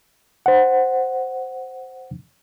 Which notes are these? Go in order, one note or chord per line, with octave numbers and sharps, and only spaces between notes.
C5 F#5